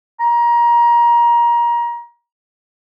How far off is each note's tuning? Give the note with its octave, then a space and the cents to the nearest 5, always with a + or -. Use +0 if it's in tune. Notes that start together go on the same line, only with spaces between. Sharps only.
A#5 +25